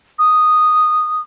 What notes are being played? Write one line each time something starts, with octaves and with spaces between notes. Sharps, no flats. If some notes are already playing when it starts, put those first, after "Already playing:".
D#6